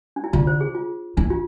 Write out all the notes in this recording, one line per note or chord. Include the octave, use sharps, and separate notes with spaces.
D4
E4
D3 F4
C5
G#4
F4
E3 D4
F4